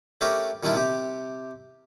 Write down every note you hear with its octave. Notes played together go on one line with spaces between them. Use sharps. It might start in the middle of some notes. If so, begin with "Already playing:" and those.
A3 C#4 D4 G4 A#4 B4
A#2 D#3 G3 D4 E4 F4
C3 G4